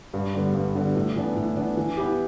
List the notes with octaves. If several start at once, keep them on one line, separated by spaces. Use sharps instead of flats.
G2
D3 G3 B3
G2
D3 G3 B3
A2
E3 B3 D4
A2
E3 B3 D4
E3
B3 E4 G4